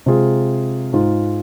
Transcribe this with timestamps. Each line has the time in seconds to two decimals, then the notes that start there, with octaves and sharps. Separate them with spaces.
0.06 C3 G#3 F4 G#4
0.93 G#2 G#3 F4